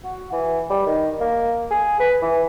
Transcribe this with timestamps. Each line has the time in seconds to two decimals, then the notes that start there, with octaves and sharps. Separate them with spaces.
0.04 F#4
0.32 E3
0.70 G3
0.86 D#3
1.20 A#3
1.71 G#4
2.00 B4
2.22 E3